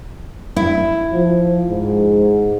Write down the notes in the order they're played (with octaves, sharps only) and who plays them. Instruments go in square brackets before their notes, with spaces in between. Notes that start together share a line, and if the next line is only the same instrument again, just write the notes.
[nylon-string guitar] E4
[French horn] F3
G#2